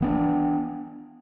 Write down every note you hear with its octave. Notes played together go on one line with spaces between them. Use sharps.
E3 B3 D4